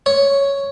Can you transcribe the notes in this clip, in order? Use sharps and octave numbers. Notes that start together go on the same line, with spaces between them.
C#5